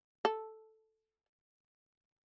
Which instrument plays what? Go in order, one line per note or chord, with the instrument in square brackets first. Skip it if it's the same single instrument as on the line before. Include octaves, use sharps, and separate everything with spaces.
[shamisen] A4